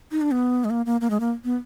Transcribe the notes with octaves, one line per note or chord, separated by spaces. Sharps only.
D#4
D4
B3
G#3
A#3
A#3
A#3
G#3
A#3
B3